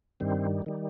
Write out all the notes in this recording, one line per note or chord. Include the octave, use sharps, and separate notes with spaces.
G2 D#3 G3 C4
D#3 G3